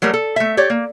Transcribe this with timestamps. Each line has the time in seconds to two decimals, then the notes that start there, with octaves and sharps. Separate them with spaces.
0.02 F#3 G3 A3 A#4
0.14 A4
0.36 A3 E5
0.57 G4 C#5 D5
0.70 A#3